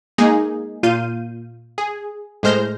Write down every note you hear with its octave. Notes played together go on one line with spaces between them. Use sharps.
G#3 A#3 D#4 G#4
A#2 F4 F5 G6 D#7
G#4
A2 G#3 C5 F6 G6 A#6